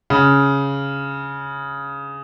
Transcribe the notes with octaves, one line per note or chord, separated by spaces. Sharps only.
C#3